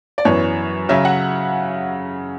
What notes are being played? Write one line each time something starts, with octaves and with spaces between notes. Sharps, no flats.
D5
F#2 E3 B3 C#5
C#3 F#3 C#4 E5
F#5